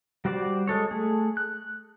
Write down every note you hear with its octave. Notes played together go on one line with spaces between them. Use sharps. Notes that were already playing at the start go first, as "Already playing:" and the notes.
G3 F#4 C5 D5 D6
G#3 A4 C#5
A3 G#4
F#6